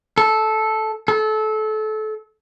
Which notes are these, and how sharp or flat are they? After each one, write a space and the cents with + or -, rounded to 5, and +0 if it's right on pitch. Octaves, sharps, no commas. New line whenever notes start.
A4 -10
A4 -25